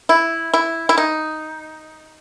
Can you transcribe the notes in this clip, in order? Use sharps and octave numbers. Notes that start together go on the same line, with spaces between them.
E4
E4
E4
D#4